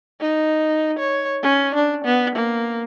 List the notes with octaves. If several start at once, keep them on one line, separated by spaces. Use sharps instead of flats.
D#4
C#5
C#4
D4
B3
A#3